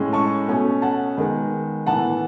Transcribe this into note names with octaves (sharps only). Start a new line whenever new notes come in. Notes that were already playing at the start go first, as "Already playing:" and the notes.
Already playing: A2 G#3 C#4
A5 C#6
B2 A3 C#4
F#5 A5
D#3 G#3 B3
A2 E3 B3 F#5 A5